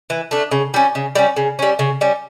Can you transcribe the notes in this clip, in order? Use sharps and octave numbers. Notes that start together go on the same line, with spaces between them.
E3
A3 D4
C#3
G3 C#4
C#3
G3 C#4
C#3
G3 C#4
C#3
G3 C#4